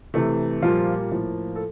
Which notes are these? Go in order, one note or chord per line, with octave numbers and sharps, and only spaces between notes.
C3 E3 A3
A#2 F3 G3 A#3 F4
A2 F3 A#3
A4